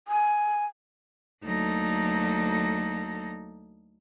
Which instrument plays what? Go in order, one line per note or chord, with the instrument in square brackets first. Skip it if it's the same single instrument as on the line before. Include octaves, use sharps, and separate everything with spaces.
[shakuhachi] G#5
[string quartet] D2 F#3 A#3 D#4 A4 A#6